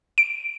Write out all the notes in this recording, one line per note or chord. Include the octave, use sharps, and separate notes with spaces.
D7